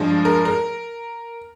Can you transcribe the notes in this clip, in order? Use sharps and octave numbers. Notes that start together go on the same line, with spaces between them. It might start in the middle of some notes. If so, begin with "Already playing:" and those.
Already playing: G2 F3 G#3 D4
A#4
A#4